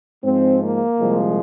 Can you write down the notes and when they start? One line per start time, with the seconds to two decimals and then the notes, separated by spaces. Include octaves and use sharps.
0.23 G#2 F3 G#3 C4
0.61 A#3
0.98 C2 A#2 F3 G#3